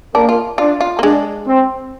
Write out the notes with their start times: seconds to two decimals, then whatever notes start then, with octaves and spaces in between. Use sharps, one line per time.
0.15 A#3 D4
0.29 F4
0.58 D4 F4
0.81 F4
0.99 A#3
1.03 G#3 D4
1.47 C4